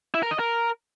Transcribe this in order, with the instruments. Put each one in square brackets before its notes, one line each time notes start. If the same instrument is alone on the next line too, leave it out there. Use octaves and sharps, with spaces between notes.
[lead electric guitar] E4
A#4
D#5
A#4